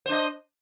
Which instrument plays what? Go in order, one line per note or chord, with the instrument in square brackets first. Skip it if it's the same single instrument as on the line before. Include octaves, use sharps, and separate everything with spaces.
[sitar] C5
D4
D#5